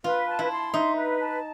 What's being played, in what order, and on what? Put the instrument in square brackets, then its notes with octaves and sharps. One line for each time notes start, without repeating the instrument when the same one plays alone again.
[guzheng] F4 [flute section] B4
[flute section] A5
[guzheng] E4
[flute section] C6
[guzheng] D#4 [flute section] E5
[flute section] B4
A5